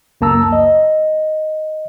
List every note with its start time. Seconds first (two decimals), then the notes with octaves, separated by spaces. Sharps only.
0.21 C#2 F#2 A#3 A5 A#5 E6
0.52 D#5